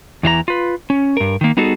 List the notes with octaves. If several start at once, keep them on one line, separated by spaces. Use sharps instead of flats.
E2 E3 F4 A#5
F4 B4
C#4
G2 A#4
D#3 A#3
G3 B3 D#4 F#4 G#4 A4